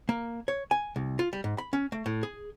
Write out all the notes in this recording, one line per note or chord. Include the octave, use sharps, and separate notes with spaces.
A#3
C#5
G#5
C2
F4
G3
G#2
B5
C#4
A3
A2
G#4